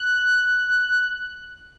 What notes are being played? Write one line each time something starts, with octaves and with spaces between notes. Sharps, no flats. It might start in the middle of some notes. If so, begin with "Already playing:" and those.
Already playing: F#6